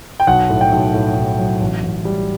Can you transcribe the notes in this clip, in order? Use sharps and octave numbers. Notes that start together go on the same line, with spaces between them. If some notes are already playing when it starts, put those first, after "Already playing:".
G5
B1 F#5
A2
G5
B1
A2
B1
F#3
A1
A1
G3